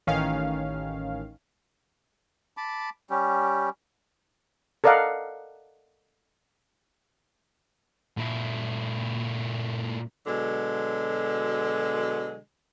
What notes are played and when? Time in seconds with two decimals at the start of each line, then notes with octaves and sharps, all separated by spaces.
0.07 A1 D#3 C#4 F5
2.57 A5 B5 D6
3.10 G3 C#4 G4
4.84 A4 A#4 D5 D#5 F5 F#5
8.17 A#2 E4
10.26 B2 D3 F#3 G#3